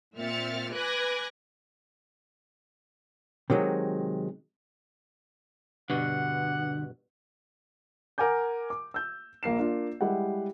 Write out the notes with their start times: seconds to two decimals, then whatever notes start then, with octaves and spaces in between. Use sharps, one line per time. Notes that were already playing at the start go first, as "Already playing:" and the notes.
0.17 A#2 C4 E5 F6 A6 C#7
0.73 B4 G#5 D6 F#6 G#6 A#6
3.50 C3 D#3 F#3 G#3
5.90 G2 B2 D3 F#4 F#5
8.18 A#4 F#5 G#5 D6 G6
8.70 D6
8.94 E6 G6
9.43 A#1 A#3 C7 E7
9.59 A#3 D4 F4
10.01 G3 G#3 E4 G4 F#5